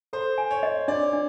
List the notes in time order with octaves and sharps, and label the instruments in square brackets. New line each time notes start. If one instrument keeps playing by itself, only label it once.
[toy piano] A4 [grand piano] C5
[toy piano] G#5
[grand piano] C#5
[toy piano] D#5
[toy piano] D4 [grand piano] D5
[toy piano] D4